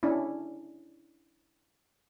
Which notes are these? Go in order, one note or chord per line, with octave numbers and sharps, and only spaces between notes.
C#4 D4 E4